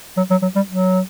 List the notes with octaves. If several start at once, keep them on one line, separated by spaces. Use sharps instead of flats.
F#3
F#3
F#3
G3
F#3